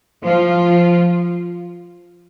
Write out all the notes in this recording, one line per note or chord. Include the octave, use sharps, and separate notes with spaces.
F3 F4